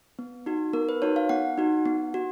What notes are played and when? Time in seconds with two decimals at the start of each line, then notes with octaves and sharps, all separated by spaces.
0.19 B3
0.46 D#4 F#4
0.73 B3 A#4
0.89 B4
1.02 D#4 F#4 C#5
1.16 F5
1.29 B3 F#5
1.58 D#4 F#4
1.86 B3
2.14 F#4